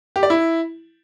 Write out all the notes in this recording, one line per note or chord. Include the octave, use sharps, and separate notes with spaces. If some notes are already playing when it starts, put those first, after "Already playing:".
G4
D5
E4